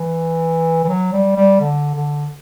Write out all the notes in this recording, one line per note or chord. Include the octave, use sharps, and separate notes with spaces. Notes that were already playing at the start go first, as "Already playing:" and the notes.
Already playing: E3
E3
F#3
G3
G3
D3
D3